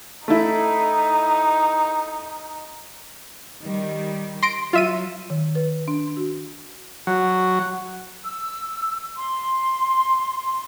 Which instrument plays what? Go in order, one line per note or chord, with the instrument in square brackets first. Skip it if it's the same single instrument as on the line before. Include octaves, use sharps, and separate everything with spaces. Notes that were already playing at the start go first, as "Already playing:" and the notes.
[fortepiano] A3 E4 [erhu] D#4
[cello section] D#3 G3
[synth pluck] C6 A#6 D7
[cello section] F#3 [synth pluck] F4 E5 D#7
[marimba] D#3
B4
D4
F#4
[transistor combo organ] F#3
[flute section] E6
C6